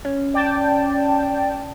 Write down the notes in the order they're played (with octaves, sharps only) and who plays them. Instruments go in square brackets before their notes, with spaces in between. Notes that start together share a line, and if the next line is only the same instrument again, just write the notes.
[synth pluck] C#4
[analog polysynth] D5 G5 A5